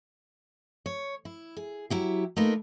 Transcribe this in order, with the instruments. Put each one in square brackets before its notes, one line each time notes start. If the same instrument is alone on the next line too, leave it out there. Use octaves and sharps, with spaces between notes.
[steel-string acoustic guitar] C#5
E4
G#4
F#3 E4 G4
A3 A#3 D#4 F4 A#4 B4